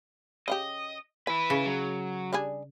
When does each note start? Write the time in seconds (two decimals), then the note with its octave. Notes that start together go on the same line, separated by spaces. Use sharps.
0.48 C#3 F4 G4 D#5
1.27 E3 E4 B4
1.50 C#3
1.66 F#3
2.33 G3 D4 G#4